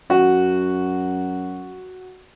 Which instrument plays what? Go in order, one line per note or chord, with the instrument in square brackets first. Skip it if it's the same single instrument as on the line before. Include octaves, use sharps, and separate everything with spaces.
[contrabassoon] F#2 [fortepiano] F#4